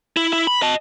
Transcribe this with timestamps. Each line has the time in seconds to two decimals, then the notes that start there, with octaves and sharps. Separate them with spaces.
0.17 E4
0.33 E4
0.47 B5
0.62 D#5 A5